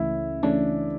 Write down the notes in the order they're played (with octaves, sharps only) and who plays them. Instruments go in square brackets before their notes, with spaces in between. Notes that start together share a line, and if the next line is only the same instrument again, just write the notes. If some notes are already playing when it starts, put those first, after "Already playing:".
Already playing: [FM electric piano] C#2 C#3 E3 A3 C#4 [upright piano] E4
[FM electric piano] C#3 E3 A3 C#4 [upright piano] D4